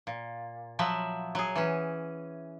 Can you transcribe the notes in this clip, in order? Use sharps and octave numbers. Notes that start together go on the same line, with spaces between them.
A#2
F3 F#3 E5
F#3 G#4
E3 C#4